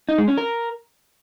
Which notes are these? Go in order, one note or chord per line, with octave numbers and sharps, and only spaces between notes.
D#4
G#3
C#4
A#4